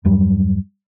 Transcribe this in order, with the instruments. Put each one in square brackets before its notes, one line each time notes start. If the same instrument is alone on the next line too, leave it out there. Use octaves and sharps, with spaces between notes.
[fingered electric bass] E2 G2 F#3 G3